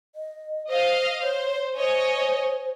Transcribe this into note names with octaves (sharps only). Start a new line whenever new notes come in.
D#5
C5 D#5 F5
C5 C#5
C5 C#5 D#5 G#5